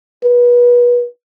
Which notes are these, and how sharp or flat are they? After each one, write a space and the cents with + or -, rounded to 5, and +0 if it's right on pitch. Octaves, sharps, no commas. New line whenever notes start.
B4 -30